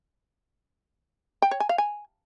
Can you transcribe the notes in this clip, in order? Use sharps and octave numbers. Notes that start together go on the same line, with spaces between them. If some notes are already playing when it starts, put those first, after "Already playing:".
G5
C#5
G#5
F5
G#5